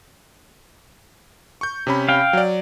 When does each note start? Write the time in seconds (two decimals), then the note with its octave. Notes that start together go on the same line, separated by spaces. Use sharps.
1.61 C#6 G6
1.87 C3 C#4 B5
2.09 F5 G5
2.33 F#3 D5